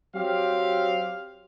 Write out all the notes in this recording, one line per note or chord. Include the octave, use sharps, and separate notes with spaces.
F#3 C4 G4 F5